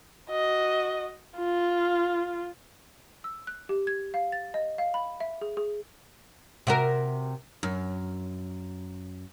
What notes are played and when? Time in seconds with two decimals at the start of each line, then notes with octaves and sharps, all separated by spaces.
0.30 F#4 D#5
1.38 F4
3.24 E6
3.47 F#6
3.69 G4
3.87 G#6
4.14 F5
4.32 A6
4.54 D#5
4.78 F5
4.94 B5
5.20 E5
5.41 G#4
5.57 G#4
6.67 C3 F#4 A#4
7.63 F#2